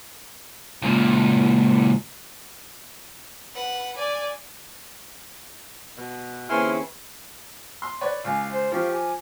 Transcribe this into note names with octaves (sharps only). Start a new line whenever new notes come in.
C#2 A#2
B4 F#5
D5 G#5
B2
D#2 C#3 C4 E4 B4 G#5 C6 F6
C6
B4 C#5 D5
C#2 F5 G#5
C5
F3 G4 F5 C#6
G#5 D6